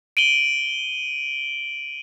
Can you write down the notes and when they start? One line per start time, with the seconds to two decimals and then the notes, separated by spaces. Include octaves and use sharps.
0.17 D7 D#7 F#7 G7